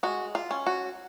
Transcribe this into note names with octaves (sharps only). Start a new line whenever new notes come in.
G#3 F#4
F4
C#4
F#4